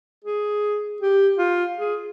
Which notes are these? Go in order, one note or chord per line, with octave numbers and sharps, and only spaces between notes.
G#4
G4
F4
G#4